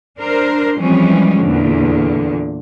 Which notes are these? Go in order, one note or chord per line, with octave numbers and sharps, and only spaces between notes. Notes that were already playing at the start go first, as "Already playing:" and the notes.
D4 A#4 C5
E3 F3 G3 G#3 C4 C#4
E2 A#2 D3